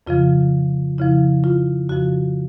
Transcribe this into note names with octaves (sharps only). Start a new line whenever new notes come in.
F2 C#3 F3 F4
F2 C#3 F3 E4
F4
F2 C#3 F3 F#4